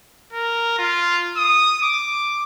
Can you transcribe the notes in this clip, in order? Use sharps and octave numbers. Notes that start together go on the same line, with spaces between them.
A#4
F4
D#6
D6